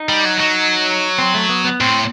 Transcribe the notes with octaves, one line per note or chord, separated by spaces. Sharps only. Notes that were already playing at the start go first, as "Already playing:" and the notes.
Already playing: D#4
G3
F#3
F#3
C4
A3
B3
B3
A2 C4